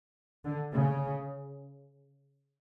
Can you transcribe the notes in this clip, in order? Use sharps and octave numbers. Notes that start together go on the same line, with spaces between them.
D3
C#3